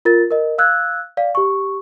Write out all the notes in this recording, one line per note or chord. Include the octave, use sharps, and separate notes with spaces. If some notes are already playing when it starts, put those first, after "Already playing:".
F4 A#4 A6
A#4 D#5
F5 E6 F#6 G#6
D5 F5
G4 C#6